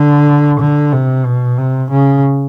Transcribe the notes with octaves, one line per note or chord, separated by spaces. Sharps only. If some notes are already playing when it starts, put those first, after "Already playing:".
Already playing: D3
D3
C3
B2
C3
C#3